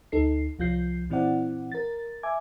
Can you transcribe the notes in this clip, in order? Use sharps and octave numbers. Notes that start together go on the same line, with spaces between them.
D2 D#4 A4 C7
C2 F3 F4 G6 C7
A#2 E3 C4 E4 D5 F#5
A#4 A6
E5 G#5 D6 G#6